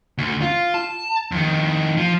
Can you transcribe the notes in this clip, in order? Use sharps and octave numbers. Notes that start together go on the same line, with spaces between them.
D2
F4
A5
F2 D#3
F3